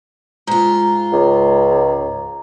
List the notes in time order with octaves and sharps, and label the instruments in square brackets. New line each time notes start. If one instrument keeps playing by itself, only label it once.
[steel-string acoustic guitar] G#2 F4 [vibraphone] A#5
[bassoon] C#2